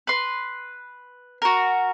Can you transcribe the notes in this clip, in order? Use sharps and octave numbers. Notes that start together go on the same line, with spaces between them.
B4 C6
F#4 A#4